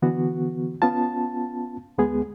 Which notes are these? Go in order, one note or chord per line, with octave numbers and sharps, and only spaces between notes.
D3 E3 B3 F#4
B3 C#4 F4 A5
D2 G#3 B3 G#4